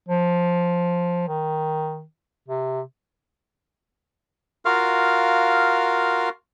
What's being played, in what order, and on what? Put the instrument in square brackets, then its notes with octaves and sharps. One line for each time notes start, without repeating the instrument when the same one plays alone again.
[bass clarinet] F3
D#3
C3
[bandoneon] F4 F#4 A#4 F5 F6